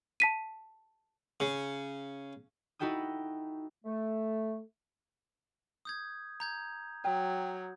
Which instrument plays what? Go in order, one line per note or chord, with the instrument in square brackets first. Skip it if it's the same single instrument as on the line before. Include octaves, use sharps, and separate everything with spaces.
[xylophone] A5 B6 D#7
[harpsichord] C#3
[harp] D#4 E4 F#4 A4 G5 D#6
[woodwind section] A3
[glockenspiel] D#6 G6 G#6
A#5 G6 G#6
[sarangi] F#3 [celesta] G5